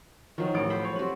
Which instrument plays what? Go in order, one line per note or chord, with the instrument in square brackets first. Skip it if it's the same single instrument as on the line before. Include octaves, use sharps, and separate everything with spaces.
[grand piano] D#3 [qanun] F3 F#3
[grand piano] A1 D7
[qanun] A4 C5 B5
[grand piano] C#5
[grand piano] G3 C4 [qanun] F#4 B4